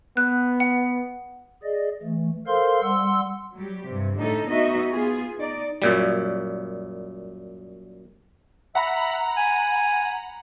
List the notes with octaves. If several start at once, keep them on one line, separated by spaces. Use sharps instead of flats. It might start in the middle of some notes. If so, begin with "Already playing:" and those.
B3 F#6
F#5
G#4 D5 D#5
E3 A3
A4 A#4 C5 F5 C6
G3 F#5 C6 E6
F#3 G3 G4
G2 C3
A2 D3 D#4 A4
B3 D#4 F#4 D#5 E5
B3 F4 G#4
D#4 D5
F#2 A#2 G3
E5 F#5 A#5 B5
G#5